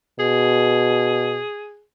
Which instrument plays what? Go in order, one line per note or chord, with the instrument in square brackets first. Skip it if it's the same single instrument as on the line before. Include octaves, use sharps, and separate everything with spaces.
[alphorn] B2 [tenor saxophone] G#4